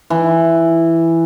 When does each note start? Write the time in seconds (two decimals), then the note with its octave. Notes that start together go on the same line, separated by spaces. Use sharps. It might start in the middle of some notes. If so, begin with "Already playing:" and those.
0.10 E3